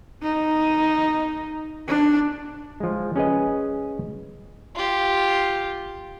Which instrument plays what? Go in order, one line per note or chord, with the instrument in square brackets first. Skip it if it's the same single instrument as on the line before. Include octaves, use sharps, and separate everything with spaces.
[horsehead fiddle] D#4
D4
[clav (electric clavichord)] F3 G#3
C#4 G#4 B4 D#5
[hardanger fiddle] F4 G4